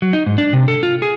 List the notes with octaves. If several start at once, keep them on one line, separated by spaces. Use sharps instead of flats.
F#3
D#4
G#2
D4
C3
A4
F4
G#4